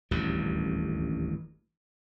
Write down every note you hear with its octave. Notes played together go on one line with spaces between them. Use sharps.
D#1 A1 D2 G2